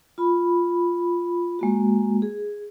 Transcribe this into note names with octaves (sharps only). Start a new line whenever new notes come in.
F4 B5
G#3 A#3 F#4
G#4